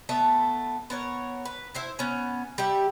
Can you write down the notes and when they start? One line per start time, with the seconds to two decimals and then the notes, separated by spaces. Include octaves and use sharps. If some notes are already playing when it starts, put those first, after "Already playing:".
0.09 A3 B3 E5 A5
0.90 B3 A#4 C#5
1.45 B4
1.75 E4 C5 E5
1.99 B3 C#4
2.58 G3 G4 E5